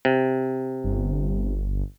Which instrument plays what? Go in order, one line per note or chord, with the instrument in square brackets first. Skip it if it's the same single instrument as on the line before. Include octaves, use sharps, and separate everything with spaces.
[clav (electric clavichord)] C3
[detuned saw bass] G1